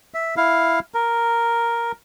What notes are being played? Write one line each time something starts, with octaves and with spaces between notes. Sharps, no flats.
E5
E4 F5
A#4